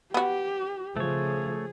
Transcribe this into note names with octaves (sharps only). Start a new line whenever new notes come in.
B3 F#4 G4
C#3 F3 A3 G#4 C#5